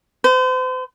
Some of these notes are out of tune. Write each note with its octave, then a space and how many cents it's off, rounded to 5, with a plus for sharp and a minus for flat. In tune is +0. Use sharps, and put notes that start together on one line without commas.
C5 -40